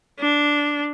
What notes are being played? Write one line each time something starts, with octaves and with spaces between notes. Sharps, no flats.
D4